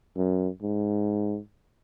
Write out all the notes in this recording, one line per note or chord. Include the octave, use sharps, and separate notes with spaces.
F#2
G#2